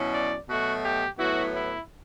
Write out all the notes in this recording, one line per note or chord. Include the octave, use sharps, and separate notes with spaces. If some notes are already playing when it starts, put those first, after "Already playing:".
Already playing: B2 F#3 C#4 E4
D5
B2 F#3 A3 F#4
G4
A2 F#3 B3 E4 F#4
E4